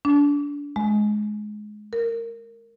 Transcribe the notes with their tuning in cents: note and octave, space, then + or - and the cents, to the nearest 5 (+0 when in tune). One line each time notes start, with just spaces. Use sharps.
D4 -30
G#3 +20
A#4 -15